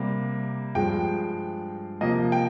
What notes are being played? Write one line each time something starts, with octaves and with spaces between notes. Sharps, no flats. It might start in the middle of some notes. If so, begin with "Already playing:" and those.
Already playing: C3 G3 A#3
G2 F3 G#3 G5
C3 F3 A#3 D#5
G5